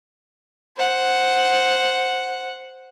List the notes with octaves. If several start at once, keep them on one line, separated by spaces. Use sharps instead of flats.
C5 F#5